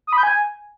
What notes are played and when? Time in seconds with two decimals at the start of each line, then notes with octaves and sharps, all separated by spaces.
0.07 D#6
0.13 B5
0.18 G6
0.23 G#5